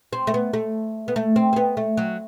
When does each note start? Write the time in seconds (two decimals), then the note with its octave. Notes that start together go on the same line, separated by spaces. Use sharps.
0.13 C4
0.27 A3
0.34 B3
0.53 A3
1.08 B3
1.16 A3
1.36 C4
1.53 C4
1.56 B3
1.77 A3
1.97 F#3